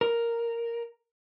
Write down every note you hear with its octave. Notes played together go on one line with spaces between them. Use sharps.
A#4